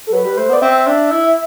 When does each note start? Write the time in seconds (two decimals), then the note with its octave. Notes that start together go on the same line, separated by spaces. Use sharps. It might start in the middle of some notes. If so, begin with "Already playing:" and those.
0.07 A4
0.12 F#3 B4
0.24 G3
0.37 A3 C5
0.49 B3 D5
0.62 C4 E5
0.87 D4
1.11 E4